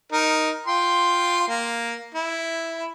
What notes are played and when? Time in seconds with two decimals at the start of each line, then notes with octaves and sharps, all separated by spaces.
0.12 D#4 A#4
0.67 F4 G5 C6
1.48 A#3
2.15 E4